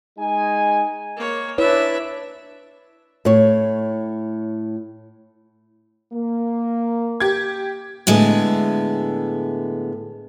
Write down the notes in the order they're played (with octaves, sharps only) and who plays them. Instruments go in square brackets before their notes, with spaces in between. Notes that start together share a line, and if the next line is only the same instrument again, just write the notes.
[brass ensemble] G#3 D#4 G#5
[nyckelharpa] A#3 C#5
[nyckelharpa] D4 E5 [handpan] E4 B4 C#5
[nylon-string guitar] A2 C#5
[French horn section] A#3
[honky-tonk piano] G4 G#6
[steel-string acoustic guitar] A2 D3 G#3 B3